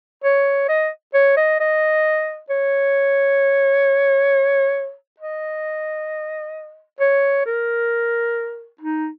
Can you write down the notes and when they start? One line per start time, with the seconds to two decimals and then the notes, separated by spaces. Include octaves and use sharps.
0.24 C#5
0.69 D#5
1.14 C#5
1.37 D#5
1.60 D#5
2.50 C#5
5.20 D#5
7.00 C#5
7.46 A#4
8.81 D#4